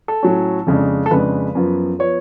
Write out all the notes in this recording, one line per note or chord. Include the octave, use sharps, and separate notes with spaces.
A4
A2 F#3 C#4
F2 C#3 G#3 D4
A4
F2 C#3 G#3 D4 B4
F#2 F3 B3
F3 B3 C#5